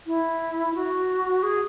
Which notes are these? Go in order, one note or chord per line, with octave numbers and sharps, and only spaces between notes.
E4
F#4
G#4